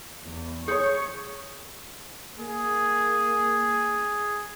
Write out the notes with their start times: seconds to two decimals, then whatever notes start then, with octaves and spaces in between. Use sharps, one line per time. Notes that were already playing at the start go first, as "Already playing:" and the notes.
0.23 E2
0.68 G#4 C#5 C#6 D#6 G6 C#7
2.40 A#3 G#4